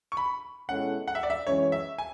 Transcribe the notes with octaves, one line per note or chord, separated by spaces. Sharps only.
C#6
B5
B2 G#3 C#4 E4 A4 F#5
F#5
E5
D5
E5
F#2 E3 G#3 C#4 C#5
E5
G#5